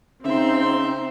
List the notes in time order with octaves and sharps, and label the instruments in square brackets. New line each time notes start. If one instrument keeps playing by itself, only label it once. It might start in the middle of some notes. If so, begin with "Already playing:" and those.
[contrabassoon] C#3 [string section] C4 [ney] D#4 [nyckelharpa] E5 C6